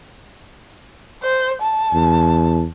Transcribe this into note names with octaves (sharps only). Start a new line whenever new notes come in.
C5
A5
E2